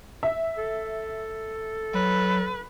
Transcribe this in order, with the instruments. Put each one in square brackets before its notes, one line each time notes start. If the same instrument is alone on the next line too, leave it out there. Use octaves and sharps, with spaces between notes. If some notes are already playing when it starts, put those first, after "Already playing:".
[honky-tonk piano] E5
[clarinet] A4
[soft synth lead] F#3 [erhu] B4